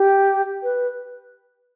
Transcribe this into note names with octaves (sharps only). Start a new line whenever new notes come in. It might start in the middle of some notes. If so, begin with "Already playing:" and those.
Already playing: G4
B4